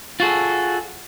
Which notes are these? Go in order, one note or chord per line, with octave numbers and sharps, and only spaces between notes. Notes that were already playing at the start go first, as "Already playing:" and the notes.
F4 F#4 G#4 A4